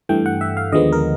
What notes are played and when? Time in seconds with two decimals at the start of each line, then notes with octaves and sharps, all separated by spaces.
0.09 G2 E3 A3 G5
0.26 F#5
0.41 E5
0.57 F5
0.72 D#2 D3 F3 G#3 B3 D#5
0.93 A#4